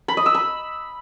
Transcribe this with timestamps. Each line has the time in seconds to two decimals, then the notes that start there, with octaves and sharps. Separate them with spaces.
0.08 B5
0.17 D#5
0.26 E6
0.35 B5